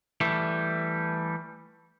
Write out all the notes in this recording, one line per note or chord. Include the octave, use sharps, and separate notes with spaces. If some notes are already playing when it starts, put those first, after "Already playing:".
E3 G3 A3